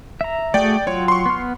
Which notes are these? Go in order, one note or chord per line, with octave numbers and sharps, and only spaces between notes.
E5 A#5
A3 F#4 G#4 D5 G5
F#3 F4 C#5 G5
C6 C#6
B3 F6